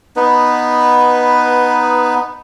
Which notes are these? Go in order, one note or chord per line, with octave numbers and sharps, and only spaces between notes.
B3 D#4 B4